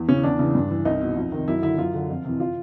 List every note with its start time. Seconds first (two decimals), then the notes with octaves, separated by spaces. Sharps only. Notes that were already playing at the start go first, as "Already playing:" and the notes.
Already playing: E2
0.09 C#3 E3 C#4
0.23 E2 D4
0.39 C#3 E3
0.55 G2
0.71 E3
0.85 C2 D#4
1.01 B2
1.17 F2
1.32 C3 D#3
1.48 F#2 E4
1.62 D3 E4
1.78 F#2 F4
1.94 D3
2.09 F2
2.25 C3 E3
2.40 F4